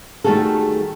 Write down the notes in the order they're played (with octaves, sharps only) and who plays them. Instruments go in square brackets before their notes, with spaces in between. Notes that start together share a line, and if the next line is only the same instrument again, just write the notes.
[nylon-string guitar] D#3 G3 A3 F#4 G#4 A4